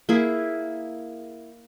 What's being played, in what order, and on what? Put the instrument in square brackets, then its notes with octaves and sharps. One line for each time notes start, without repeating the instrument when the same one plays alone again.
[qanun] A#3 E4 G#4